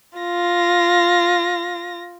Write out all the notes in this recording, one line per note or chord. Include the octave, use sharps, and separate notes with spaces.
F4 A#6